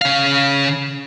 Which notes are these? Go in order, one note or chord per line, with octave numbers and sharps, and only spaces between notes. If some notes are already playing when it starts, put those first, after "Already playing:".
C#3 F5